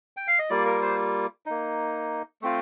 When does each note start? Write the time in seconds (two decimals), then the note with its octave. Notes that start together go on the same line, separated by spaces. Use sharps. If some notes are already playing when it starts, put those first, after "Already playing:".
0.17 G5
0.28 F5
0.39 D#5
0.50 G3 A#3 F4 D5
0.66 A#4
0.82 C5
1.46 A#3 D#4
2.42 A3 C4 F4